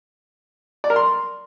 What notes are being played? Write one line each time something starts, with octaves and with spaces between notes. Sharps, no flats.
D5
A#4
C6